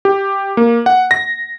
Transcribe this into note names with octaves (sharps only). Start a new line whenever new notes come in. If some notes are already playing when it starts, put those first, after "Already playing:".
G4
A#3
F#5
A#6